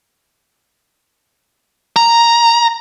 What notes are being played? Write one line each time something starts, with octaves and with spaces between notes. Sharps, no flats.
A#5